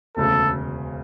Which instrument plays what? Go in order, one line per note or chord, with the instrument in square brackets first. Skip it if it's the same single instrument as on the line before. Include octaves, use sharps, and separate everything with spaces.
[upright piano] E1 D2 C#3 [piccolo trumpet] A4